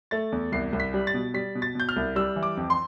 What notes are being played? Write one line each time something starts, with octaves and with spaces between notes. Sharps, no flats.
A3 A6
E2
C2 C7
C2
B6
G3
A6
B2
G3 B6
B2
A6
B2 G6
F6
C2
G3 E6
E3
D6
F2
C6